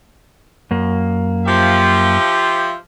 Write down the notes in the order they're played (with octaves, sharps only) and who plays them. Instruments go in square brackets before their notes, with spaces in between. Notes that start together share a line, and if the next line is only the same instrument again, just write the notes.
[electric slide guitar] F#2 A#3
[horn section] F3 G4 E5